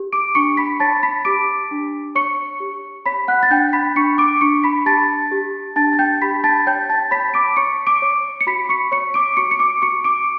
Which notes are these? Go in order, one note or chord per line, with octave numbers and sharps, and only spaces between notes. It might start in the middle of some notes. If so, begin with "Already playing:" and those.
Already playing: G4
D6 D7
D4 C#6 C#7
B5 B6
C#5 A5 A6
B5 B6
G4 D6 D7
D4
C#5 C#6 C#7
G4
C#5 B5 B6
F#5 F#6
A6
D4 G5 G6
B5 B6
D4 C#6 C#7
D6 D7
D4 C#6 C#7
B5 B6
G4 A5 A6
G4
D4 A5 A6
A6
G5 G6
G4 B5 B6
A5 A6
C#5 G5 G6
A5 A6
C#5 B5 B6
D6 D7
C#5 C#6 C#7
D6 D7
C#5
C#7
F#4 B5 B6
C#6 C#7
C#5 C#6 C#7
D6 D7
F#4 C#6 C#7
C#7
D6 D7
F#4 C#6 C#7
D6 D7